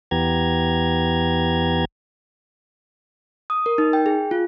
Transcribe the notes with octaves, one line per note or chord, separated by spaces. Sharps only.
E2 E3 B3 G4 A#5 G#6
D#6
A#4
D#4
G5
G#4
F4